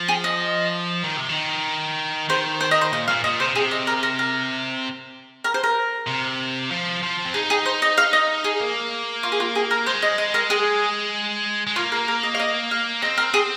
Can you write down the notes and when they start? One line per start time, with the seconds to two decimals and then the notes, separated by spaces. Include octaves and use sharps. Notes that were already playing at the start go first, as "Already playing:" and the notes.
Already playing: F3
0.08 G#4
0.24 D#5
1.03 D#3
1.17 C3
1.29 D#3
2.29 D#3 C5
2.61 C5
2.71 D#5
2.81 C5
2.93 A#2 D#5
3.08 A#2 F5
3.24 A#2 D#5
3.40 C3 C5
3.55 C3 G#4
3.71 D#5
3.87 A#4
4.03 A#4
4.19 A#4
5.44 A#4
5.54 C5
5.64 A#4
6.07 C3
6.71 F3
7.03 F3
7.25 C4
7.34 D#4 G#4
7.50 G#4
7.66 C5
7.82 D#5
7.98 F5
8.13 D#5
8.44 G#4
8.61 A#3
9.23 F4
9.32 G#4
9.40 F4
9.55 G#4
9.71 A#4
9.86 G#3 C5
10.02 D#5
10.18 D#5
10.34 A#4
10.50 G#4
11.67 G#3
11.76 A#3 F4
11.92 A#4
12.08 A#4
12.23 D#5
12.35 F5
12.40 D#5
12.71 F5
13.02 C4 D#5
13.18 A#4
13.34 G#4